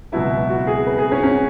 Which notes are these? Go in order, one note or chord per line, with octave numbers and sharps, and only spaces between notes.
C#2 B2 F#3 E4
F#4
G#4
B4
G#4
C#4
C#4